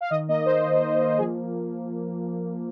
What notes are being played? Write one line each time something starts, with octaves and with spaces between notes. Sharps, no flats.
F5
D#3 D#5
A#3 D#5
A#3 C5
D#3
A#3
A#3
F3 G#4